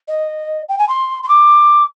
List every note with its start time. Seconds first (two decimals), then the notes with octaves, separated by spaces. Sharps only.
0.08 D#5
0.69 G5
0.78 G#5
0.89 C6
1.23 C6
1.29 D6